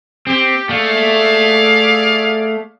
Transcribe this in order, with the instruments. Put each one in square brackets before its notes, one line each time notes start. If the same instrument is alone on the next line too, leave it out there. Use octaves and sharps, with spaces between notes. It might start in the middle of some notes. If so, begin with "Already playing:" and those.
[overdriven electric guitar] C4 [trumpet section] G4
[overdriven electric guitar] A3 [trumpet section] G#4 D5 F5